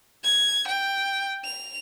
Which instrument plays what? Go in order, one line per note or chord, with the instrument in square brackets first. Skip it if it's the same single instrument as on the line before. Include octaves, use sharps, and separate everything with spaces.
[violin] G#6
G5
F7